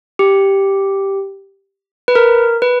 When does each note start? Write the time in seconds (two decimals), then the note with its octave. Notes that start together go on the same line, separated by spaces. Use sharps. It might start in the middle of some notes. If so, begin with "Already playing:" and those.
0.19 G4
2.08 B4
2.15 A#4
2.62 B4